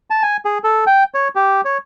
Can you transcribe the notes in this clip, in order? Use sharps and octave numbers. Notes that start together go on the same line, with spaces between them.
A5
G#5
G#4
A4
G5
C#5
G4
C#5